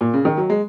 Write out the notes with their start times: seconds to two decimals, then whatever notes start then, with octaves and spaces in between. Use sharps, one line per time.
0.01 A#2
0.14 C#3
0.25 D#3
0.37 F#3
0.50 G#3